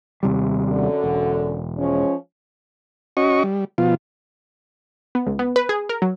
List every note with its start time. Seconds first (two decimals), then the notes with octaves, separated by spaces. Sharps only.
0.23 D#2 C3 G3
0.69 F#2 D3
1.04 E1
1.77 F3 G#3 C#4
3.17 C#4 F#4 D#5 C#6
3.43 G3
3.78 B2 F3 F4
5.15 B3
5.27 C#2
5.39 B3
5.56 B4
5.69 G#4
5.89 A#4
6.02 F#3